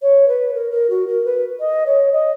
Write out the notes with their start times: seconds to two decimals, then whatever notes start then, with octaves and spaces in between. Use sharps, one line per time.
0.02 C#5
0.28 B4
0.54 A#4
0.71 A#4
0.89 F#4
1.07 A#4
1.25 B4
1.60 D#5
1.86 C#5
2.12 D#5